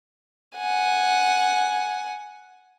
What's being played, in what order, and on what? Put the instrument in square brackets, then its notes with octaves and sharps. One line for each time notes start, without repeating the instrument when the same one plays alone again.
[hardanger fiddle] F#5 G#5